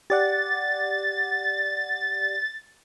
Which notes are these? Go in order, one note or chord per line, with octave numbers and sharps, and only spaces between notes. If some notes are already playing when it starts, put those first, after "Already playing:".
G4 D5 F#5 A6